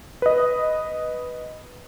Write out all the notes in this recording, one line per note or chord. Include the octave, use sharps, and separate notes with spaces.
B4 D#5